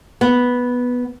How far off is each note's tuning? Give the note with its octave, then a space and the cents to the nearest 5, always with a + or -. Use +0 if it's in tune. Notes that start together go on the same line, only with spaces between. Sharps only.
B3 -5